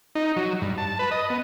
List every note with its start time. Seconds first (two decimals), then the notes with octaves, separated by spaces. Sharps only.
0.15 D#4
0.36 F#3
0.62 G2
0.78 A5
0.99 B4
1.11 D#5
1.30 B3